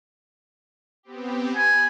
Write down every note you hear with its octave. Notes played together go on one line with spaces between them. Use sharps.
B3 C4 G4
G#5 B5